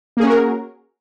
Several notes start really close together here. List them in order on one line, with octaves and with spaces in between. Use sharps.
A#3 G#4 C#4 F#4 A#4